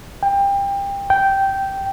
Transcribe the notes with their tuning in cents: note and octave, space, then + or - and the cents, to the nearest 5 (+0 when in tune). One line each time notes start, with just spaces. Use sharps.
G5 +25
G5 -10